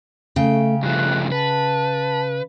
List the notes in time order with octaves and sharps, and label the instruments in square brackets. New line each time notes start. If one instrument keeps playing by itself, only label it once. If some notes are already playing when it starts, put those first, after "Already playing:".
[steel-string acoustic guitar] C#3 G5 [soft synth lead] A3
[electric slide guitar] G2 F3 A3 [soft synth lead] F#6
[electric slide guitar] B4 [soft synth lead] A5